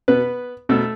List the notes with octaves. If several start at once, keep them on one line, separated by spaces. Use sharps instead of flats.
B2 B3 B4
B2 A3 A4